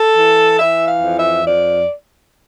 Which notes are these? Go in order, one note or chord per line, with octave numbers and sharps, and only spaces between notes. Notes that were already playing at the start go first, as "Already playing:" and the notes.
Already playing: A4
E3
E3 E5
F5
F2
E5
F2 D5